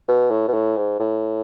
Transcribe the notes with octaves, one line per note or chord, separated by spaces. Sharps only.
B2
A2
B2
A2
G#2
A2